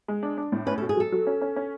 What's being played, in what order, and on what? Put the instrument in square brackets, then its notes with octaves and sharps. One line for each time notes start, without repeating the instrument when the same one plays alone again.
[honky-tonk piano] G#3
D4
D4
A2
[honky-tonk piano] C#4 [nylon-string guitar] B4
[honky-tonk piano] B2 [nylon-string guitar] A4
[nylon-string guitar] G#4
[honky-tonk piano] F#3 [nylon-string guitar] A4
[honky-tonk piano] F#3
C#4
C#4
C#4